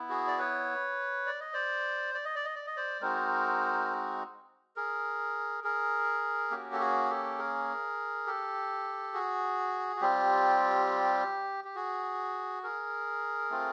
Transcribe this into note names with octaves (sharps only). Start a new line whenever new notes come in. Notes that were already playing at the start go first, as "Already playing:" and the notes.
Already playing: B3 E4
F#4 G#4
D5
B4 C#5
D5
D#5
C5 D5
D5
D#5
D5
D#5
D5
D#5
C5 D5
G#3 C4 D#4 F#4 A#4 C5
G#4 A#4
G#4 A#4
A#3 C#4 F#4 G4
A4
F#4 G#4
G4 A4
G#4 A#4
G4 A4
F#4 G#4
F#4
G3 C4 F4 G4
G4
F#4 G#4
G#4 A#4
A3 C4 F4